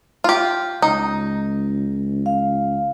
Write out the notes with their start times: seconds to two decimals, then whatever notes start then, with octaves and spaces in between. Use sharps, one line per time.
0.24 F4 G4
0.82 C#2 D#4
2.26 F5